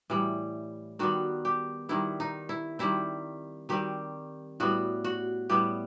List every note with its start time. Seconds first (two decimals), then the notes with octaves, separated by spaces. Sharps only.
0.10 A2 E3 G3
0.99 D#3 G3 B3 F#4
1.45 G4
1.89 D#3 G3 B3 E4
2.20 D#4
2.49 E4
2.79 D#3 G3 C4 E4
3.69 D#3 G3 C4 G4
4.60 A2 G3 B3 F#4
5.04 F#4
5.50 A2 G3 B3 G4